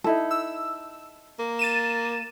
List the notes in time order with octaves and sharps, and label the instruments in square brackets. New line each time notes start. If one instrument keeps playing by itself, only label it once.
[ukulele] D#4 E4 A4
[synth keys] E6
[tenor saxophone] A#3
[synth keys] A6 D#7 E7